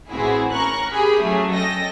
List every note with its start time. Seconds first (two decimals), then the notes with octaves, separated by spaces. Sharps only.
0.11 A1 E3 C4 E4 F#4 G#4
0.52 C#4 A#4 A#5 C#6 F#6
0.90 G4 G#4 B5
1.21 F#3 A3 C#4 G#4
1.52 C#4 A4 D#5 G5 A#6